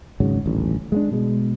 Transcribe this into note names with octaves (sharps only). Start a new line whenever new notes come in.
G#1 G#2 C#3 F#3
D#1 A1 D2
G#3 A#3 D4
B2 G#3